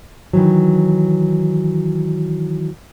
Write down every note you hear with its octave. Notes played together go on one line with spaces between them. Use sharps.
D#3 E3 F#3